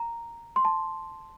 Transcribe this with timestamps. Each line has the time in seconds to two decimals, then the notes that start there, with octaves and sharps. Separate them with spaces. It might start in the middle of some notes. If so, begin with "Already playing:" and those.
Already playing: A#5
0.56 C6
0.65 A5